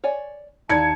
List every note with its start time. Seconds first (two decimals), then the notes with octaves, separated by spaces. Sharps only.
0.04 C#5 D5 G#5
0.69 D#2 D#4 E4 D5 F5 A5 G#6 C#7